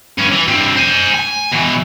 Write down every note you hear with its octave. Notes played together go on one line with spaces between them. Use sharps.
G2 C#4
E3
G2 C4
C5 G#5
G#5
B2 E3